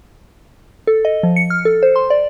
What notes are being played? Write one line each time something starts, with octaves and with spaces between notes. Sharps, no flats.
A4
D#5
F3
C#7
F6
A4
C5
C6
D5